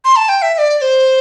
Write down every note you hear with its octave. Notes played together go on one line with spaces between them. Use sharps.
C6
A5
G5
E5
E5
D5
D5
C5